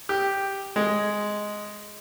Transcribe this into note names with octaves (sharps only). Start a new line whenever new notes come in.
G4
G#3